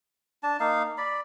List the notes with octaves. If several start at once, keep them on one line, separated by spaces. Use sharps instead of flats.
D4 A5
A#3 D#4 F5
D5 B5